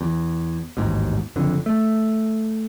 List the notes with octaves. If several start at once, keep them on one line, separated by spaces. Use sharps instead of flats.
E2
A1 D#2 G#2 B2
F#1 F2 D3
A3